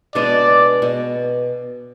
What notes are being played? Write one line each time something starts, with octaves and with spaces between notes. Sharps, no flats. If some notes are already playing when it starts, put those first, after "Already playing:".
B2 G#3 B3 D4 D5
B2